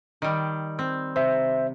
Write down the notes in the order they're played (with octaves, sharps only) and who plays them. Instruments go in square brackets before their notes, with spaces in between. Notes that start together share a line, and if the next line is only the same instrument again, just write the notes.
[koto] D#3 G3
C4
[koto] C3 [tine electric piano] C5 E5